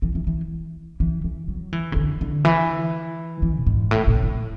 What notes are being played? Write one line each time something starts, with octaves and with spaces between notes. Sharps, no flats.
E3
E3
E3
E3
E3
F#3
E3
C#3
D3
D3
E3
E3
A2
G#2
A2
A2
A2